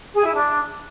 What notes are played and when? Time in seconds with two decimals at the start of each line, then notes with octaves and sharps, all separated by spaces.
0.14 G#4
0.24 E4
0.34 D4